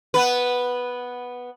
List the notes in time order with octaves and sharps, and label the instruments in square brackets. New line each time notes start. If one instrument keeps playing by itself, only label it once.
[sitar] B3 B4